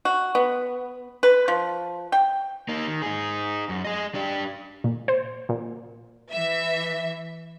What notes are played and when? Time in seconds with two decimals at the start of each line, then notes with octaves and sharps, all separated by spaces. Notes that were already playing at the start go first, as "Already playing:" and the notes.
0.05 F#4
0.35 B3
1.23 B4
1.48 F3
2.12 G5
2.69 A#3 D#4
2.88 D#3
3.02 D#4 G#4
3.69 F#2
3.84 G#4 D#5
4.15 D4 G4
4.84 A#2
5.08 C5
5.49 A#2
6.32 E3 E5